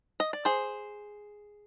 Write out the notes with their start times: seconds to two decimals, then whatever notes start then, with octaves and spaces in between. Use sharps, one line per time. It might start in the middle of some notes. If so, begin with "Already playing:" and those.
0.20 D#5
0.33 D5
0.45 G#4 C5